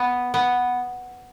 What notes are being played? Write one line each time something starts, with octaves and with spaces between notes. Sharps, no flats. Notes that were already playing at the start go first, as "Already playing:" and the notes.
Already playing: B3
B3